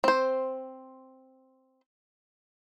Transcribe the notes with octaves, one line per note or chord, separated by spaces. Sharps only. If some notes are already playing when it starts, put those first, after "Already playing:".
C4 C5